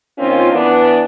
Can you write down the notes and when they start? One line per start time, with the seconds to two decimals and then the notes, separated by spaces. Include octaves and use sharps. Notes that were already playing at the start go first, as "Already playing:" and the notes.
0.19 D#3 A#3 C4 C#4 F4
0.52 E3 B3 D4